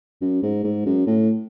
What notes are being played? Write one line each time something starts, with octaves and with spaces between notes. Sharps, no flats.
F#2
G#2
G#2
F#2
A2